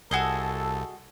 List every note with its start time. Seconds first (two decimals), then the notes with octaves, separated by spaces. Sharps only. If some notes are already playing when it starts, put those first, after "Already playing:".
0.11 C2 F#4 G#4 A4 D#5